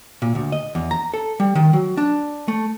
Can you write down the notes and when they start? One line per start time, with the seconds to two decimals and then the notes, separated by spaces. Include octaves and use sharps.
0.22 A#2
0.35 D2
0.52 D#5
0.75 E2
0.91 A#5
1.14 A4
1.40 G3
1.55 D#3
1.73 F#3
1.97 D4
2.48 A3